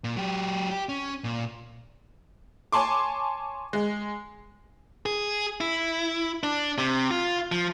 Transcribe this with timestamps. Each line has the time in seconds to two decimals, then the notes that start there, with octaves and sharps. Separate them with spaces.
0.04 A#2
0.17 F#3 G4
0.71 G4
0.89 C#4
1.24 A#2
2.72 C#5 G#5 A5 C6 D6
3.73 G#3
5.06 G#4
5.61 E4
6.43 D4
6.78 C3
7.11 F4
7.52 F3